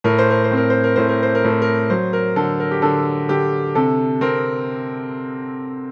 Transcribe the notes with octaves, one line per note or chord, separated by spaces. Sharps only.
A2 A#4
C5
A#4
C5
C4
A#4
C5
A#4
A2 C5
A#4
C5
A#4
A2 C5
A#4
F#3 C5
A#4
D3 A4
A#4
G4
D3 A4
D3 G4
C3 A4
C4 A#4